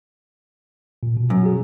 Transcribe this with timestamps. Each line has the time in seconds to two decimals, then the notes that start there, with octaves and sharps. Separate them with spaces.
1.03 A#2
1.17 B2
1.30 F#2
1.43 F#4 G#4